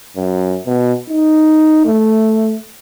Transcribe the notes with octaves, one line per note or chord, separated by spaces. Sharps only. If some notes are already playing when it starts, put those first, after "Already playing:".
F#2
B2
D#4
A3